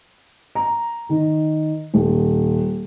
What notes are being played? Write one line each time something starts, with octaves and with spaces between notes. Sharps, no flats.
A#5
D#3
D#1